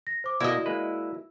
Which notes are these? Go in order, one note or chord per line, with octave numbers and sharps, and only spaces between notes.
A#6
C5 D6
B2 A#3 E4 F#4 D5 D#5 F#5
G#3 A#3 B4